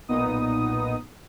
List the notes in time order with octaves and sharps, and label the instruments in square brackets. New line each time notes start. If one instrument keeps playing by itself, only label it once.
[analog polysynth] B1 A#2 B3 D#4 D#6